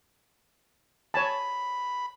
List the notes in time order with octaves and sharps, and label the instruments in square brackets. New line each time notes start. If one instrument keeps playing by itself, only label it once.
[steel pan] C#5 G#5 A5 [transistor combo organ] B5